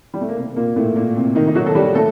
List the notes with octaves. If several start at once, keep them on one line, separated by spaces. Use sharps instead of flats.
G3
A3
A#3
C3 C4
A#2 A#3
A2 A3
A#2 A#3
C3 C4
D#3 D#4
D#4
F#3 F#4
A4
G3 G4
A3 A4